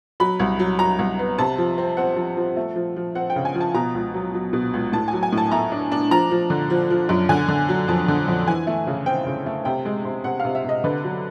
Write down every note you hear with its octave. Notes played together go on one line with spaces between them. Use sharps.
F#3 B5
C2
F#3
F#3 A#5
C2
B3
C3 A5
F3
C4
C4 F#5
F3
F3
A3
F3
F3
C4 F#5
G5
C#3
G#5
F3
A5
B2 A#5
C#2
F#3
F#3
B2
C#2
A2 A5
F#3 G#5
G#5
A2 A5
A3 A#5
D4
D4
F3 A#5
F3
D3
F3
F3
F#2
D3 G#5
D3
F#3
F2 A5
D3
F2
E3 G#5
A3
C#3
C4 G5
C#3
A3
C3 G5
G#3
C3
C3 F#5
F5
C3
E5
C3 D#5
D3 B4
F#3